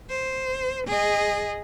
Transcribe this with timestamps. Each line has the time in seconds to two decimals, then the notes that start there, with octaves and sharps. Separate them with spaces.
0.10 C5
0.87 G#4 D#5